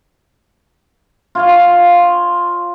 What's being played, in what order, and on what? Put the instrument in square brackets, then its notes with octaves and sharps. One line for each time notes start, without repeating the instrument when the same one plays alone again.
[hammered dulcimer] F4 C#5 F5